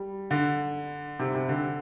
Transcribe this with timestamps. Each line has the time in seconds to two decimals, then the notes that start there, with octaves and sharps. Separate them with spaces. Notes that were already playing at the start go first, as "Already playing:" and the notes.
Already playing: G3
0.31 D3
1.19 C3
1.35 C3
1.49 D3